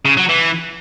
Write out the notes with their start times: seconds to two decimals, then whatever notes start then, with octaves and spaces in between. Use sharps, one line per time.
0.05 C#3
0.17 F#3
0.29 E3